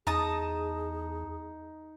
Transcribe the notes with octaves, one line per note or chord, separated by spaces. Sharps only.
E2 D#4 G#4 A5 A#5 D#6